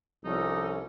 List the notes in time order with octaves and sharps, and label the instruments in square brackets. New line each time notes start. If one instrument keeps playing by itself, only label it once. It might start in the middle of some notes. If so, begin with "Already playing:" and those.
[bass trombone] C2 [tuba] F3 [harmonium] C#4 A4 [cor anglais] D#4